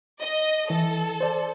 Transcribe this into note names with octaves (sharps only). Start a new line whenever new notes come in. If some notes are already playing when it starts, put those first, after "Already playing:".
D#5
E3 A4
C5 D5